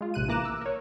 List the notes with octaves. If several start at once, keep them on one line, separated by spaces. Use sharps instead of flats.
G#3 F4
A#1 C3 F#6 D#7
E3 A#3 A#5 D6 F#6 E7
E6
A#4 C#5